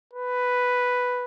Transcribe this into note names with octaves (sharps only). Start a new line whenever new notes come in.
B4